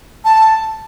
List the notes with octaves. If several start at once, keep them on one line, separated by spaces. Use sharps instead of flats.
A5